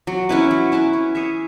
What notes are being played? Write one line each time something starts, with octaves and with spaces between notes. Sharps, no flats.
F#3
C#4 E4 B4
F#3
C#4 E4 B4
C#4
G#4 C#5 E5